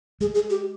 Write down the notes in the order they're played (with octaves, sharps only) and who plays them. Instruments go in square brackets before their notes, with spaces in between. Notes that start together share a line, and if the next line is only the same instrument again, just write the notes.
[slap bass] G#3 [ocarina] G#4
[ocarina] G#4
G4